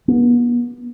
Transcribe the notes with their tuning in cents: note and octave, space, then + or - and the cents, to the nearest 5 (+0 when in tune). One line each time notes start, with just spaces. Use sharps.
B3 -40